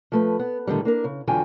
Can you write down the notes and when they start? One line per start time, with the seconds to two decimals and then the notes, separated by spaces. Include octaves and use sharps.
0.12 F3 A3 B4
0.39 B3
0.67 A2 D3 D#3 F#3 G3
0.85 A#3 D4 A#4
1.04 C#3
1.27 E2 D3 F#3 F4 G5 G#5